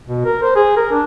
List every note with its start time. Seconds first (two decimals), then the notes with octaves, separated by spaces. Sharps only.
0.08 B2
0.25 A#4
0.43 C5
0.56 G#4
0.77 A#4
0.92 D4